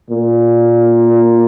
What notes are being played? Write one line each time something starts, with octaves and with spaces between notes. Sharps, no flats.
A#2